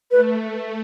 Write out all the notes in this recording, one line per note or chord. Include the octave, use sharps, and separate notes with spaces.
A3 B4